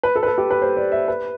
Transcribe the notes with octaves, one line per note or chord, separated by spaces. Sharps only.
B4
A4
B4
A4
G4
B4
C5
D5
E5
B4